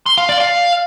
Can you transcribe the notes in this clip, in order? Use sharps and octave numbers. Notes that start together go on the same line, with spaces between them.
C6
F5
D5
F5